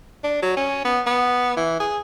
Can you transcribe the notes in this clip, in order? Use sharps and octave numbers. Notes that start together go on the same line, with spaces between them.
D4
F#3
C#4
B3
B3
E3
G#4